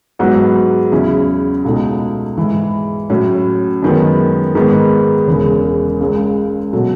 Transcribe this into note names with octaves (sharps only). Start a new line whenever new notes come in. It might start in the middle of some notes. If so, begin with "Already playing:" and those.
G#2 F#3 B3 F#4
E2 C#3 F#3 C#4 E4
C#2 B2 A3 D#4
G#2 E3 G#3
A2 F#3 C#4 F#4
F#2 D#3 G#3 B3
G#2 D#3 G#3 B3
E1 E2 C#3
C#2 C#3 G#3
B2 F#3 A3